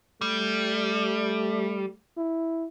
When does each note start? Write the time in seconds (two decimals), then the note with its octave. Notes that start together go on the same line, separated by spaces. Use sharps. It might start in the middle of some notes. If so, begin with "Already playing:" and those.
0.21 G3 A3
2.17 E4